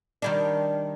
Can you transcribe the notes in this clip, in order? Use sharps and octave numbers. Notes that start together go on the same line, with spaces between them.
D#3 G3 D4